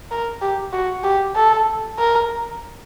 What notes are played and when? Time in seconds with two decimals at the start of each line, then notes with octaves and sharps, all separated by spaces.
0.11 A#4
0.41 G4
0.73 F#4
1.04 G4
1.36 A4
1.98 A#4